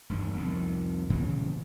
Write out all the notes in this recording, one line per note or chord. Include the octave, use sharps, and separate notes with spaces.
E1 G2 D#3
C2 F2 D#3
A#2 C#3 E3 G3